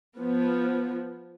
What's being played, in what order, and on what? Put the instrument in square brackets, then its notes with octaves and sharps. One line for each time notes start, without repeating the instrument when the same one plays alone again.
[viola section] F3 B3